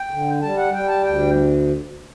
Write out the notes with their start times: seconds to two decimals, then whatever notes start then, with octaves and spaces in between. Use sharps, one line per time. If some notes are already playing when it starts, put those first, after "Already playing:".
Already playing: G5
0.11 D3
0.42 G3 A5
0.57 F#5
0.73 G3 G5
0.88 A5
1.03 D2 G5